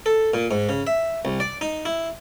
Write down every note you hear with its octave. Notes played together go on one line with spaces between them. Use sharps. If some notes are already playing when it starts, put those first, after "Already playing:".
A4
A#2
G#2
C#3
E5
C2
D5
D#4
E4